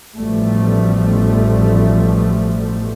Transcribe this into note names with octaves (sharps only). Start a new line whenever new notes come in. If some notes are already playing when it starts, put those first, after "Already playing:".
A1 B2 F3 G3 A3